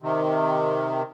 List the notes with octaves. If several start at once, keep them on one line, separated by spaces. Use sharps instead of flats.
C3 D#3